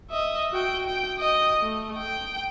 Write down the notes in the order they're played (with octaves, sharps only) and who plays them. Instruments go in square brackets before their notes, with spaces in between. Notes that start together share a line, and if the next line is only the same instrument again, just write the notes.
[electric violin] D#5 E5
F#4 G5
G5
D#5
A3
G5